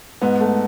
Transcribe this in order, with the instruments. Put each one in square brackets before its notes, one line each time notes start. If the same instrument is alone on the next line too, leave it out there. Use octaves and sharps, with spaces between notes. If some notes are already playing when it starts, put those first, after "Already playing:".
[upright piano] G#2 B3
A3